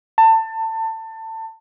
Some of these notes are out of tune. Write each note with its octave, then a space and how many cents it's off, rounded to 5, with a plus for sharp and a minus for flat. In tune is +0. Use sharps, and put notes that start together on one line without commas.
A5 +25